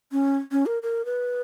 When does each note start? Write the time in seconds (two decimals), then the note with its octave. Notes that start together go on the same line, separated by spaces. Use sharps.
0.12 C#4
0.52 C#4
0.66 A#4
0.83 A#4
1.05 B4